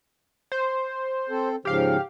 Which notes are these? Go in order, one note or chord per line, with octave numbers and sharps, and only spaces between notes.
C5
C4 A4
G#2 C#3 F3 G4 F5